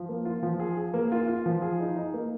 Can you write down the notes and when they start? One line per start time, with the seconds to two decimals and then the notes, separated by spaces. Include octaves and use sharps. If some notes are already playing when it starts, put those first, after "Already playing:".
Already playing: F3
0.09 A#3
0.25 F4
0.43 F3
0.59 G#4
0.77 G#4
0.94 A#3
1.12 F4
1.28 F4
1.46 F3
1.62 G#4
1.80 D#4
1.96 D#4
2.14 A#3